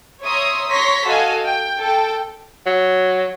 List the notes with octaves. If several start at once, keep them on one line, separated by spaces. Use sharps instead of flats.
C#5 E5 A#5 C6 D#6
C#5 A#5 C6 C#6 A#6 B6
F#4 A4 D#5 F5 G#5
G5
A4 G5
F#3